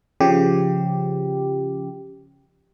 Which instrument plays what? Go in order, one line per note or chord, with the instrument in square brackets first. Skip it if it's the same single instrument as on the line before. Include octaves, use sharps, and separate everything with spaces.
[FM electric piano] C#3 F3 G4